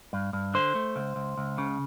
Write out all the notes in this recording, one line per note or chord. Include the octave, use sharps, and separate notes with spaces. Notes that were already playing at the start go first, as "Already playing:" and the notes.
G2
G2
D3 C5
A3
C#2
C#2
C#2
C#3